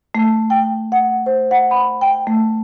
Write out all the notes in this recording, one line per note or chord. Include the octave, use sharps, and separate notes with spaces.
A3
G5
F#5
C5
F#5
B5
G5
A3